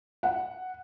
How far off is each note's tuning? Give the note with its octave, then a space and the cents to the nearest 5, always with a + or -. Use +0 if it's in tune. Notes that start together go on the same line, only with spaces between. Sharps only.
F#5 +0